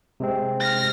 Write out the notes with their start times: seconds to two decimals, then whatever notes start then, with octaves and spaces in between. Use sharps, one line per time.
0.20 C3 G#3 C4
0.60 F6 A#6